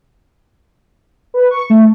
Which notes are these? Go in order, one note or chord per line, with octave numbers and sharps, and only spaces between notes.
B4
C#6
A3